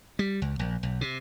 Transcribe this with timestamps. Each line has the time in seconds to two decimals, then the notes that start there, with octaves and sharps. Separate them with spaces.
0.19 G3
0.42 C#2
0.59 A#1
0.83 B1
1.01 C3